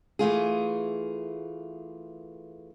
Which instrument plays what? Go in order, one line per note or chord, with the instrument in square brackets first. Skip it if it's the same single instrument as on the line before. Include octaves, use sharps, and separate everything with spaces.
[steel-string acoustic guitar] E3 A3 F4 G#4